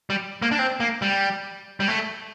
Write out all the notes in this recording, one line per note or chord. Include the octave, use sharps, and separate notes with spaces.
G3
A#3
D4
C4
A#3
G3
G3
A3